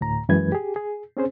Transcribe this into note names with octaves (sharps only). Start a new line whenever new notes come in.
D2 A2 A#5
F#2 E3 G#3 B4 G#6
G4 G#4
G#4
C4 C#4 G#4 C5